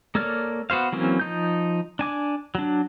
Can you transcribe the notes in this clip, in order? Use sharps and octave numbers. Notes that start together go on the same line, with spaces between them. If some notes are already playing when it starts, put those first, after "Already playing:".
A#3 A4 C#5 D5 F6
B3 F#4 C5 F5
E3 F#3 A#3 C4 C#4
F3 D#4 G6
D4 G#5 D6
F#3 D4